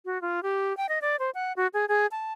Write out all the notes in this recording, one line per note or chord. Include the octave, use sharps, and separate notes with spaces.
F#4
F4
G4
G5
D#5
D5
C5
F#5
F#4
G#4
G#4
A5